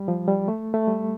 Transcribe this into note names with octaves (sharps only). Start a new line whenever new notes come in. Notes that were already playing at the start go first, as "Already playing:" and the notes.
Already playing: G3
F3
G3
A3
A3
G3